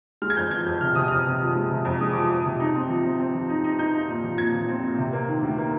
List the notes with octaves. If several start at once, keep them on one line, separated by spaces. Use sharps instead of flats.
G#3 F6
G#6
F2 G6
F3 G#6
F2 G6
C3 F6
C3 D#6
F2 F6
C3
F3
G#3
C3
F2
G#3 D#6
F3 D6
D#6
F2
C3
D#4
C4
F3
C4
C4
F3
D#4
D#4
D#4 G6
D#4
A#2
F3
A#2 G#6
F3
C4
A#2
C3
A#3
D#3
D2
A#3